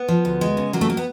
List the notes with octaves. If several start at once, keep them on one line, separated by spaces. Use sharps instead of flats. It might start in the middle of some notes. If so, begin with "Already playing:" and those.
Already playing: B3
F3
D2
G#3
C#3
F#3 A#3
A3
A#3
B3